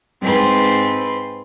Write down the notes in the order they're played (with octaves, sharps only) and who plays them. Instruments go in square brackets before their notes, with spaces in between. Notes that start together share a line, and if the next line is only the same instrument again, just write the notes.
[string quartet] G#2 C4 B4 C6